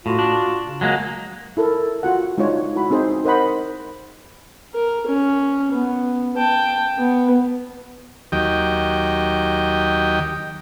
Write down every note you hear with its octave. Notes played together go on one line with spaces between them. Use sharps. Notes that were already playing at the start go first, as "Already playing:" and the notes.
A2 F4 F#4
D4
C#3
F#3 G#3 A#3
E4 A4 A#4
F4 F#4 F#5
G#3 D4 D#4 F4 C#5
E4 F#4 B5
C4 D#4 G#4 C5
A#4 C5 D#5 F#5 B5
A#4
C#4
B3
G5 A5
B3
D#2 D#3 F#3 G4 D#5 G5